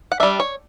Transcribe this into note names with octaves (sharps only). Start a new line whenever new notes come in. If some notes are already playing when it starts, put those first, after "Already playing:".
F#5
G3 D4 E5
C#5